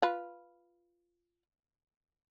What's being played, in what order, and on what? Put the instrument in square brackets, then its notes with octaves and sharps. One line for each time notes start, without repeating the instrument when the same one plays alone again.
[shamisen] F4 B4